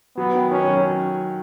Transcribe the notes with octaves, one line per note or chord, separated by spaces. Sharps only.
F#3 B3
D#3
D#3 C#4
F#3